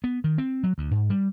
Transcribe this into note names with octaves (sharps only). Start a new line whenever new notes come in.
B3
D#3
C4
F#3
D2
G#2
G3